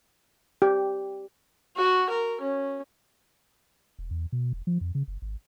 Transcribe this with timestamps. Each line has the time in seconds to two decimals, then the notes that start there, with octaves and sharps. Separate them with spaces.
0.62 G4
1.76 F#4
2.09 A#4
2.41 C#4
3.99 E1
4.11 E2
4.32 B2
4.53 E1
4.67 F3
4.81 F2
4.95 C#3
5.08 F#1
5.22 G#1